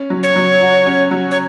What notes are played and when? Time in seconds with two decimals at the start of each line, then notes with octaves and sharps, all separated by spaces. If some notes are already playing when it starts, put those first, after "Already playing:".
Already playing: C#4
0.10 F#3
0.23 C#5
0.36 F#3
0.61 F#4
0.86 C#4
1.11 F#3
1.31 C#5